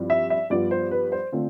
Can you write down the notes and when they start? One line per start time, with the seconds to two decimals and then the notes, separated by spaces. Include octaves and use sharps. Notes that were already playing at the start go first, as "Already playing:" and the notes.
Already playing: G2 F3 C4 E4
0.10 E5
0.30 E5
0.50 G2 F3 B3 F4 D5
0.71 C5
0.91 B4
1.12 C5
1.32 D3 A3 C4 F4